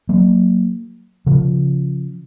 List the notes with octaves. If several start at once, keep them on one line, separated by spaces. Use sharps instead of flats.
F#3 A#3
C#3 F3